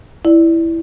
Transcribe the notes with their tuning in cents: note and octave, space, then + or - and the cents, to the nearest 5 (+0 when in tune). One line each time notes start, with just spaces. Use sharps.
E4 +0 D5 +5